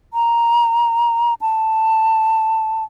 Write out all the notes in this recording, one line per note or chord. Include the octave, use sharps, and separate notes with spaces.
A#5
A5